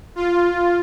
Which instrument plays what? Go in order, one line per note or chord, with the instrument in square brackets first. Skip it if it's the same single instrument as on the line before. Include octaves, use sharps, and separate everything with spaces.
[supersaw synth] F4